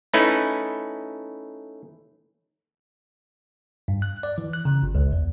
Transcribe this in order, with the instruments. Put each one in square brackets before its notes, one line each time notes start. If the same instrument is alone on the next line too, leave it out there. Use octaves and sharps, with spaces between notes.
[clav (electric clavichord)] A3 C#4 D#4 E4 B4
[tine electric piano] G2
F#6
D5
E3
F#6
C#3
G1
C#2
E2